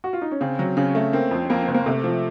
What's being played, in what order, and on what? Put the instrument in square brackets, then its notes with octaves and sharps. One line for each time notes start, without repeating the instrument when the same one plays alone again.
[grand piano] F#4
F4
D#4
C#4
[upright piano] C#3 [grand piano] C4
[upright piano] F#3
[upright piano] C#3 [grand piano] C#4
[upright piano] A3
[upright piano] A#3 [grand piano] C4
[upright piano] F2
[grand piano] C4
[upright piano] F2 [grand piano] A#3
[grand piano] C4
[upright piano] F#1
[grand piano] A#3
[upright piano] C3 [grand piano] A3
[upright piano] F3